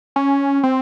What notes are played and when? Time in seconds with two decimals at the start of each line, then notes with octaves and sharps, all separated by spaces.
0.16 C#4
0.63 C4